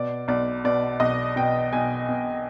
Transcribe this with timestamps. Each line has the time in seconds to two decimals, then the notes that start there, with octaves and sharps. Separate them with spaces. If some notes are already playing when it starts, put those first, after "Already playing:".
Already playing: B2 D5
0.28 B1 D5
0.64 B2 D5
1.00 B1 D#5
1.36 B2 G5
1.73 B1 G#5
2.08 B2